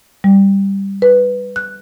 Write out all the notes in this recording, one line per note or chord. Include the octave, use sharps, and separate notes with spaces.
G3
B4
F#6